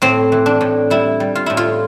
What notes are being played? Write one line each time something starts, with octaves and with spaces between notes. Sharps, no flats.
A2 C4
E3
D4
A2
G3 E4
G3
F4
A2 E4
F4